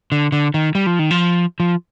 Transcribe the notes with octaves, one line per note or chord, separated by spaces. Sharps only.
D3
D3
D#3
G3
F3
D#3
F3
F3